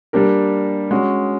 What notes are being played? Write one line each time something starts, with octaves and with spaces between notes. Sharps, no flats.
G3 A#3 D4 G4 A#4
G#3 C#4 F#4